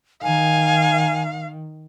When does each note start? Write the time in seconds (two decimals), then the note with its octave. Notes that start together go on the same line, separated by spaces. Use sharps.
0.23 D#3 F5 G#5